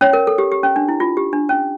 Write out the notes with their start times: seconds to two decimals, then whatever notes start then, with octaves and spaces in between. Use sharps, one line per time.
0.01 C#4 C#5
0.13 A#4
0.27 A4
0.38 G4
0.52 G4
0.63 C#4
0.76 D4
0.88 E4
1.00 F4
1.17 G4
1.33 D4
1.49 C#4